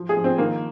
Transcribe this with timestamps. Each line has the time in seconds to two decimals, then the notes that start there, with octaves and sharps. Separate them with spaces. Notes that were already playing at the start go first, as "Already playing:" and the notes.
Already playing: F3
0.09 G#4
0.17 F3
0.24 C4
0.38 D#3 A#3